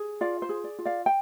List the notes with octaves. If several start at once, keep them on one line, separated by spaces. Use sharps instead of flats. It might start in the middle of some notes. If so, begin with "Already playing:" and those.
Already playing: G#4
F4 D5 F5
C5
G#4
D5
F4
D5 F5
G5